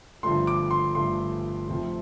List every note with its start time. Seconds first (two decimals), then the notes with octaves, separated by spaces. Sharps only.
0.23 G1 G2 F3 A3 C6
0.47 D6
0.71 C6
0.95 G1 G2 F3 A3 C6
1.67 F1 F2 C3 F3 A3